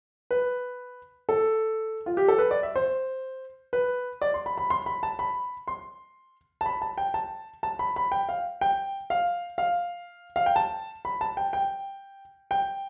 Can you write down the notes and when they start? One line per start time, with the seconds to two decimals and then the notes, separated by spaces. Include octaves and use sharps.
0.31 B4
1.29 A4
2.06 F4
2.17 G4
2.28 A4
2.39 B4
2.51 D5
2.63 E5
2.76 C5
3.73 B4
4.21 D5
4.34 C6
4.46 B5
4.58 B5
4.70 C6
4.86 B5
5.03 A5
5.19 B5
5.68 C6
6.61 A5
6.66 B5
6.82 A5
6.98 G5
7.14 A5
7.63 A5
7.79 B5
7.96 B5
8.12 G5
8.29 F5
8.61 G5
9.10 F5
9.58 F5
10.36 F5
10.46 G5
10.56 A5
11.05 B5
11.21 A5
11.37 G5
11.53 G5
12.51 G5